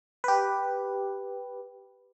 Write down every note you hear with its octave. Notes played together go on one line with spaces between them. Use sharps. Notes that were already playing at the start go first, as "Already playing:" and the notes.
G4 B4